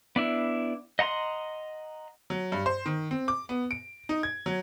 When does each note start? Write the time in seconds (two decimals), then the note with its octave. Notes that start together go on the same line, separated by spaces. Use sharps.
0.16 B3 D4 E4
0.99 D#5 F#5 A#5 C6
2.30 F#3
2.52 G2
2.66 C5
2.86 D#3
3.11 C4
3.28 D6
3.49 B3
3.71 D7
4.09 D#4
4.23 G#6
4.46 F#3